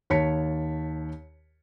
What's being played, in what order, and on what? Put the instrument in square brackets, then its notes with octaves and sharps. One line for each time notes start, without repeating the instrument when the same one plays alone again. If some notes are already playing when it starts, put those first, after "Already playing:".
[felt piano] D#2 C#5 A5 B6 C#7